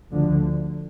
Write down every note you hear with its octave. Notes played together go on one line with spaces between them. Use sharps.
D2 D3 F3